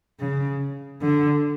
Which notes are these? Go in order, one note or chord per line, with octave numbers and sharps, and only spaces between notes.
C#3
D3